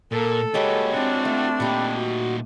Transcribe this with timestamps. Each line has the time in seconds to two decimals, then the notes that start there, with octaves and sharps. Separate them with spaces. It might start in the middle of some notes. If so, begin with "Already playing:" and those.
0.12 A#2 A4 A#4
0.54 G#3 A#3 F#4 G4 B4 C#5
0.93 C4 D4 F4 F#4
1.25 A3
1.60 A#2 D#4 G4 F#5 B5
1.96 F#4